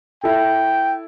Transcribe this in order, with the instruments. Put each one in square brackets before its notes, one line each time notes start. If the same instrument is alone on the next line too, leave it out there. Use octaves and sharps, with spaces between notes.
[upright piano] E4 A4 [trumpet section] G5